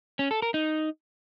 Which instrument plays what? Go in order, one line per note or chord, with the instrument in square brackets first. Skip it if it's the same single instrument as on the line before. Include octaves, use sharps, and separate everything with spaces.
[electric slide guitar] C#4
A4
A#4
D#4